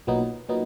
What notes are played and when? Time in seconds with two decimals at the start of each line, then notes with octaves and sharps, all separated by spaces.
0.07 B1 A#2 F#3 B3 D#4
0.49 A#2 F#3 B3 D#4